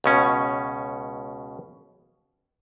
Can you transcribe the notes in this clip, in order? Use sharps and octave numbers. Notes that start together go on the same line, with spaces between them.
C#2 B2 C#4